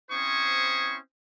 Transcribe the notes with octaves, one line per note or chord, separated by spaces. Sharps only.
C4 C#4 E4 C5 C#6 D#6